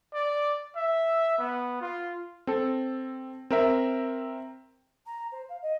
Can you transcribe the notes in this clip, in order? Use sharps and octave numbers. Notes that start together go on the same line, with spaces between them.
D5
E5
B3
F4
C4 A4
C4 A#4 E5
A#5
C5
F5
D#5